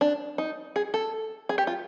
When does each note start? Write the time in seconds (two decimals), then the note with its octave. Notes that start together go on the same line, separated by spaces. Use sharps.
0.01 D4
0.38 D#4
0.76 G#4
0.94 A4
1.49 G#4
1.58 G4
1.67 F4